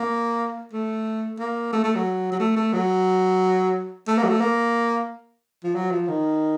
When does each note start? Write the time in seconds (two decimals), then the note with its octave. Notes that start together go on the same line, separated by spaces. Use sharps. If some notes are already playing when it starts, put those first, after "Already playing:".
Already playing: A#3
0.73 A3
1.39 A#3
1.73 A3
1.84 A3
1.95 F#3
2.32 F#3
2.40 A3
2.56 A3
2.73 F#3
4.07 A3
4.18 A#3
4.24 F#3
4.29 A3
4.40 A#3
5.64 F3
5.75 F#3
5.91 F3
6.08 D#3